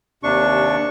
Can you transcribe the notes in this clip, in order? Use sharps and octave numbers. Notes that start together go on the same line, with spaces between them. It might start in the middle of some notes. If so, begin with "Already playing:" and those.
D#2 C3 D4 C#6